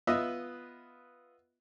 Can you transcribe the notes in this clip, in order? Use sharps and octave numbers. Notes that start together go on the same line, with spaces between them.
B3 F4 B4 D#5 E5